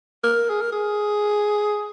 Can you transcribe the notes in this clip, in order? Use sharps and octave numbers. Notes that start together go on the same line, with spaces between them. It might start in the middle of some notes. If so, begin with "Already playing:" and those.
A#4
G#4
A#4
G#4